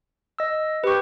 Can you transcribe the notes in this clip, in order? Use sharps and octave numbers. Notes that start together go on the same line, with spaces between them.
D#5 E6
G4 B4 C#6